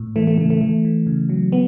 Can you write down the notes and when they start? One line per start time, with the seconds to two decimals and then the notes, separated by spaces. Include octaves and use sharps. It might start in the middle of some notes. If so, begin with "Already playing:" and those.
Already playing: A2
0.16 E3 A3
0.27 A3
0.38 C#3 A3
0.50 A3
0.61 E3 A3
0.85 E3
1.07 C#3
1.29 F#3
1.52 B3